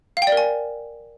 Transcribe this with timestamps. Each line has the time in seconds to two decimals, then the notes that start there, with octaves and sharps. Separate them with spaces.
0.17 F5
0.22 G5
0.27 D5
0.32 A#4
0.37 G#5